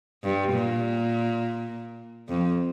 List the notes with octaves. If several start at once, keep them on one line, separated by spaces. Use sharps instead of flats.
G2
A#2
F2